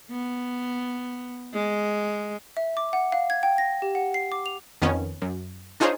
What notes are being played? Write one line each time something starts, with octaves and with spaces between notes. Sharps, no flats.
B3
G#3
E5
D6
F#5
F5
G#6
G5
A#6
G4
F#5
C7
D6
F7
F2 D#3 B3 C#4
F#2
D4 D#4 F4 G#4 C5 C#5